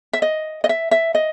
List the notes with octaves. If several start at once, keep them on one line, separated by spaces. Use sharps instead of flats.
E5
D#5
D#5
E5
E5
D#5